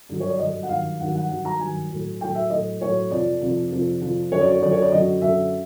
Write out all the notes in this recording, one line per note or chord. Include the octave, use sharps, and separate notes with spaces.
G2 D3 F#3
C#5
D5
G2 D3 F#3 D#5
F#5
G2 D#3 F#3 F5
G2 D#3 F#3 F#5
F#5
G2 D#3 F#3 F#5
A#5
G2 D#3 F#3 G#5
A2 F#3
A2 F#3 G5
E5
A2 F#3 D#5
A2 F#3 C#5
F2 C3 F3 D5
F2 C3 F3
F2 C3 F3
F2 C3 F3
F#2 D3 F#3 C#5
D5
C#5
F#2 D3 F#3 D5
C#5
D5
F#2 D3 F#3 D#5
F#2 D3 F#3 E5